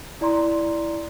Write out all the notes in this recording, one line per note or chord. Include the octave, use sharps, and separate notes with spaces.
E4 D5 A#5 C6